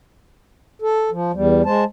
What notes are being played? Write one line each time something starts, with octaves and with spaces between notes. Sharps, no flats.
A4
F3
E2 G3
G#3 C5 A5